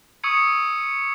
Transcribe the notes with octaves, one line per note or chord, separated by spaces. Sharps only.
C#6 D#6 E6 G#6 C#7 D#7